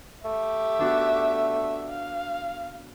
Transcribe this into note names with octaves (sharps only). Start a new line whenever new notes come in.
A3 G4 E5
B3 D4 F#4
F5